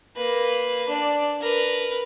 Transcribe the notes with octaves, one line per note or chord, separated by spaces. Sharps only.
A#3 B4
D4 D5
A#4 B4